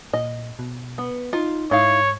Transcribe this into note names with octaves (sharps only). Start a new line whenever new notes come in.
A#2 D#5
B2
B3
D#4 F4
G#2 D#4 E4 C#5 F5